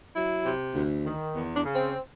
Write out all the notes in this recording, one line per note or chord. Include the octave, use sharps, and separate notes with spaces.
F#3 E4
C3
D2
D#3
E2
D4
C#3
C4